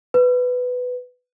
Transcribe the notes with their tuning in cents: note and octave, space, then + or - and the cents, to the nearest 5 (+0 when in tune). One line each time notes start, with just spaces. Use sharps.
B4 +10